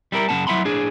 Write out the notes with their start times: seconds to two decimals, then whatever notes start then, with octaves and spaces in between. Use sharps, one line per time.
0.12 G3 E4 A#4
0.29 F#2 C#3 G#3 C4 F#5 A5
0.47 F#3 E4 E5 F#5 B5 C6
0.65 A2 D4 G#4